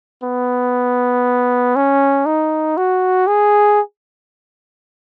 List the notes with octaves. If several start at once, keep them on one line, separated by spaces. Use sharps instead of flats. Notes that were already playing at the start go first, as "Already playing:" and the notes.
B3
C#4
D#4
F#4
G#4